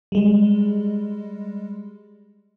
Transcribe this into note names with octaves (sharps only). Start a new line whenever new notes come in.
G3 G#3